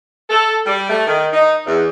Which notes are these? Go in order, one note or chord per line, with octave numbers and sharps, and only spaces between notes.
A4
G3
A3
D#3
D#4
E2